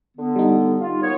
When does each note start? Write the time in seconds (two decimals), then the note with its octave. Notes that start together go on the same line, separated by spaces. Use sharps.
0.17 D3 B3
0.36 G3 D#4
0.80 F4
1.02 A#3 B3 C#5